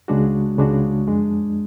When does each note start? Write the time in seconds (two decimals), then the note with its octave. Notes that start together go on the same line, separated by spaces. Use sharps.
0.08 C#2 C#3 G#3 D4 F#4
0.58 C#2 C#3 G#3 D4 F#4
1.07 F#2 F3 G#3 D4